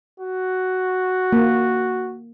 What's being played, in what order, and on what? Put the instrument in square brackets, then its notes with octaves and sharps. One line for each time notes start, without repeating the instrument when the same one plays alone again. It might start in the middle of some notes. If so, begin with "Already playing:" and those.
[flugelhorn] F#4
[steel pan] A#3